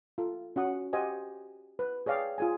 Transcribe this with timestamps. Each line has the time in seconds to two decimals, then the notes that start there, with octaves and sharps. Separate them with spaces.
0.18 F4 A4
0.56 C#4 F#4 F#5 D#6
0.93 G4 C5 D#5 F#5 G#5
1.79 B4
2.06 G#4 C#5 D5 F5 G5 D6
2.38 F4 G#4 G#5